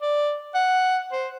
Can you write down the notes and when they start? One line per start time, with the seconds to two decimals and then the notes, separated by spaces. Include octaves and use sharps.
0.02 D5
0.54 F#5
1.12 C5